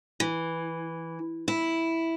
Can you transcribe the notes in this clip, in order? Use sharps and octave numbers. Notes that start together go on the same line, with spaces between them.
E3
E4